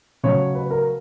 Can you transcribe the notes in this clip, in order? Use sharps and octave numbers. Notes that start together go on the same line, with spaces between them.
C#3 F#3 A3 C#4 C#5
B4
A#4